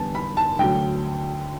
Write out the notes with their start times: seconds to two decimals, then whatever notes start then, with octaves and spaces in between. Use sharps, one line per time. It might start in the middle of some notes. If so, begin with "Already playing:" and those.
Already playing: E2 D3 G3 B3 A5
0.15 B5
0.37 A5
0.59 D2 D3 F#3 G5